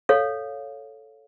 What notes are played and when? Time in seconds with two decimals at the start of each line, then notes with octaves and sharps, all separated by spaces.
0.09 A4 C#5 F5